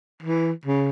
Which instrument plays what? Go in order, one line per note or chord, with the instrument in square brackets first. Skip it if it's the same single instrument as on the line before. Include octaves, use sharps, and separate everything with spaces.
[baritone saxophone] E3
C#3